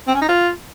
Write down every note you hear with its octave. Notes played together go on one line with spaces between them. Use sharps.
C4
C#4
D#4
F4